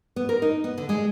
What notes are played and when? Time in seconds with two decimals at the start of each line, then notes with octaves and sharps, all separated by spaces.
0.16 B3
0.29 A#4
0.42 D#4
0.64 B3
0.78 D3
0.89 G#3